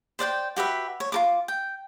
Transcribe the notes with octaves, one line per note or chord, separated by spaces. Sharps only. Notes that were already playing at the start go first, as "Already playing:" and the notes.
C5 D5 F#5 G5
F#4 G4 B4 E5
C#5
F4 A#4 D6
G5